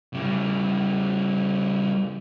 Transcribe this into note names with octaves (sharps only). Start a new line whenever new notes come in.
C#3 G3